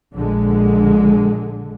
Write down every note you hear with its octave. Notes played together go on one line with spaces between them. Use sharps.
A#1 D3 G#3